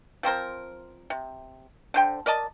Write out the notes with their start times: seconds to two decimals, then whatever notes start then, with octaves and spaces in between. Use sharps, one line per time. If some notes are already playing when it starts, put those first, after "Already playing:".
0.23 F3 C4 A#4 C5
1.10 C3
1.94 D3 C5 G5
2.26 A#4 D5 D#5 A5